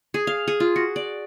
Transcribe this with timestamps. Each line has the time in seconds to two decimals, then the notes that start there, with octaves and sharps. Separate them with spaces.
0.14 G#4
0.27 F5
0.47 G#4
0.60 F4
0.76 F#4
0.96 D5